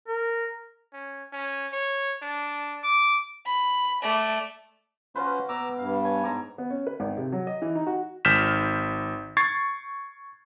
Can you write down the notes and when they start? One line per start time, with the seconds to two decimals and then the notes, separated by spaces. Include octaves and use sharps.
0.08 A#4
0.93 C#4
1.32 C#4
1.73 C#5
2.22 D4
2.84 D6
3.46 B5
4.03 A3 D5
5.16 C#4 F4 F#4 B4 C5
5.49 B2 A#5 D6 E6
5.78 G2 F5
6.04 C#5 G#5 A5
6.24 G#2 A#5 D6
6.58 B3
6.70 C#4
6.87 B4
7.00 G#1
7.17 C3
7.32 F#3
7.47 D#5
7.62 E3
7.75 D#4
7.87 F#4
8.25 G#1 F6 G6 B6 E7
9.37 C#6 G#6 A6 C7